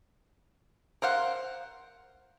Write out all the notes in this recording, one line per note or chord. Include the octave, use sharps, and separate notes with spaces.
A#4 C5 F5 F#5